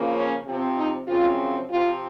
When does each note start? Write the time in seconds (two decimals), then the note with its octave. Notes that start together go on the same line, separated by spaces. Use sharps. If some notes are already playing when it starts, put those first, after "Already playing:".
Already playing: C#3 F3 A#3
0.15 C#4
0.45 C3 F3 C4
0.77 D#4
1.07 F#2 C#3 F3 C4 F4
1.69 C3 F3 C4 F4